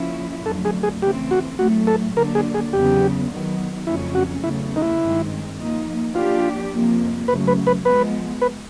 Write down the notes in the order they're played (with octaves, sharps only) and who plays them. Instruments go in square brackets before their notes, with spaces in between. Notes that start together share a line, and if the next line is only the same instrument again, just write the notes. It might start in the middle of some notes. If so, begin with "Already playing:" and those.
Already playing: [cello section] C#3 F3 A#3 C#4 E4
[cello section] F2 D3 F#3 A3 [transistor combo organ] A4
[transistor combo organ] G#4
G#4
[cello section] C#3 E3 A3 C4 [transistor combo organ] G4
[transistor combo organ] F#4
[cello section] A2 F#3 A3 [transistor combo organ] F#4
[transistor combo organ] A4
[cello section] D3 F#3 A#3 D4 [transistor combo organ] A#4
[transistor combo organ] G#4
G#4
[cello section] E2 C#3 F#3 B3 [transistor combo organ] G4
[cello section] D#3 F#3 B3
[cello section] F2 C#3 F#3 A3 C#4 [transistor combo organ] E4
[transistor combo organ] F#4
[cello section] E2 C#3 F#3 A3 [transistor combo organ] E4
[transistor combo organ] D#4
E4
[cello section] G2 D#3 G#3 C4
F3 A#3 D#4
[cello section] F3 A#3 D4 G4 [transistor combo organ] F4
[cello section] F2 C3 F3 A#3
[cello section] F#2 C#3 F#3 A3 [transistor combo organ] B4
[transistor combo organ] B4
B4
[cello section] F3 G#3 B3 [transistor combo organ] B4
[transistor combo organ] B4